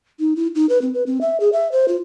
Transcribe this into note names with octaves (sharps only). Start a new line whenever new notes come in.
D#4
E4
D#4
B4
C4
B4
C4
E5
G#4
E5
C5
F4